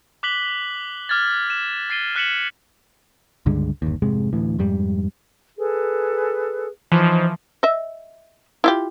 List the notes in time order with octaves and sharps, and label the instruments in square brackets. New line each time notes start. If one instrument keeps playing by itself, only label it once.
[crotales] D6 F#6 B6 F#7 G7
D6 F6 G#6 A6
E7
A6 C7 D7 D#7 G7
F6 F#6 B6 C#7 E7 F#7
[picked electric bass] C#2 G2 D3 G#3
G1 D#2
F1 G#2 C3 G#3
D2 A2 E3
F2 G#2 G3
[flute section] G#4 A4 B4
[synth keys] E3 F3 [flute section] D#4 C5
[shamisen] D#5 E5
E4 F4 G4